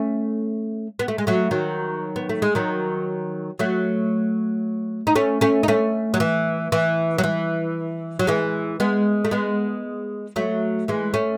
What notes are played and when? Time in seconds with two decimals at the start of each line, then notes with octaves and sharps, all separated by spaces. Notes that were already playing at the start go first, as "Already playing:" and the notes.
Already playing: A3 C#4
0.99 B3
1.08 A3
1.18 G#3
1.27 F#3 A3
1.51 D#3 F#3
2.16 B3
2.29 A3
2.42 G#3
2.55 D#3 F#3
3.59 F#3 A3
5.07 D#4
5.16 A3 C#4
5.41 A3 C#4
5.63 D#4
5.68 A3 C#4
6.14 F#3
6.20 E3
6.72 E3
7.18 F#3
7.24 E3
8.19 F#3
8.27 E3 G#3
8.80 G#3 B3
9.25 A3
9.31 G#3 B3
10.36 F#3 A3
10.88 E3 G#3
11.14 A3 C#4